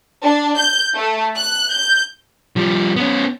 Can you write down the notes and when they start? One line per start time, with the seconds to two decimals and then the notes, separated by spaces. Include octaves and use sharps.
0.23 D4
0.58 G6
0.95 A3
1.36 F#6
1.72 G6
2.56 F3 G3
2.96 B3 C#4